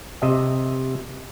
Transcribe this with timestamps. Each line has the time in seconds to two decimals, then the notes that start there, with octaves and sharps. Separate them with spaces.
0.22 C3 D#5 E5